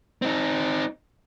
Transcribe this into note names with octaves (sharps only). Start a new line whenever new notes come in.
C4 D#4